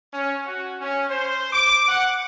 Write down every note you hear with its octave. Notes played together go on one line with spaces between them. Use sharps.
C#4
F#4
C#4
C5
D6
F#5